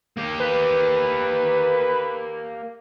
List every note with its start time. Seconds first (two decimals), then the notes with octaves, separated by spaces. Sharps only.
0.17 A#3 G4
0.40 B4